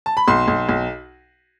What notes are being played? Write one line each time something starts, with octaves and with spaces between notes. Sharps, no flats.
A5
B5
B1 C6
B1
B1